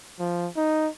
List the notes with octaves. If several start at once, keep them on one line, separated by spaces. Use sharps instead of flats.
F3
D#4